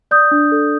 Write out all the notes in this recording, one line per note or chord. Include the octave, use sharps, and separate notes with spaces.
D5 D#6 G6
D4
A4